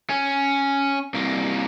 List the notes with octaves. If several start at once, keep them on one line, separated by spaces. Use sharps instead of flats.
C#4
C2 A#3